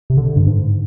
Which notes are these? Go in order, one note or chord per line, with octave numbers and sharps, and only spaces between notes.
C3
D3
G2
G#2